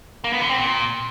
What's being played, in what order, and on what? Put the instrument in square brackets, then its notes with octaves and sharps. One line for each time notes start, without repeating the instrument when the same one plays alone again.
[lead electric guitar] A#3
B3
D3
C4
A#2